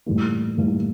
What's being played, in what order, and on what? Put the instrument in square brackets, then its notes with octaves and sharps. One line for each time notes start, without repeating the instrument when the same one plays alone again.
[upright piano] A2 E3 G3 A#3
A2 E3 G3 A#3